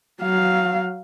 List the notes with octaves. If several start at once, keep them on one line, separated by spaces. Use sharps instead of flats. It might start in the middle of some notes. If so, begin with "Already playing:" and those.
F#3 F5